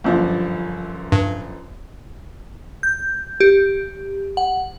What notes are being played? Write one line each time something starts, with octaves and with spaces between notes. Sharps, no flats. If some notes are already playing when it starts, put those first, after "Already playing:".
G1 F#2 F3
G2
G6
G4
F#5